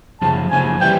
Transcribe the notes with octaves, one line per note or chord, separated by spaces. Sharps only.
F#2 C#3 F3 A5
F#2 C#3 F3 G#5
E3 G3 G5